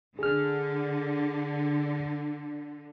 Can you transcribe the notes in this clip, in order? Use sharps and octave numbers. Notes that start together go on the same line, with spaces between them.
D3 G#4 F6